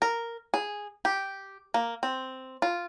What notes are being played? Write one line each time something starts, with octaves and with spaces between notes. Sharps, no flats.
A#4
G#4
G4
A#3
C4
F4